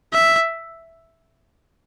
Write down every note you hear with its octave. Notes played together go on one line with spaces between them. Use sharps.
E5